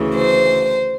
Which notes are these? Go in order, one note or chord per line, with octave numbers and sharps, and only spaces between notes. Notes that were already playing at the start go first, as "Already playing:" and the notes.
Already playing: D2 C#3 E3
C5